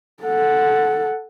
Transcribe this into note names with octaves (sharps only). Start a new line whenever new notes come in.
A4 F#5